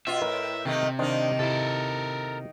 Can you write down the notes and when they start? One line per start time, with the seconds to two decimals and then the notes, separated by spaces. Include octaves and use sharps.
0.07 B2 F4 E5
0.22 A2 A#4 B4
0.65 C3 D#3 A3 A#3
0.99 D#3 A#3 D4 C5 D#5
1.39 C3 E4 A4 A#4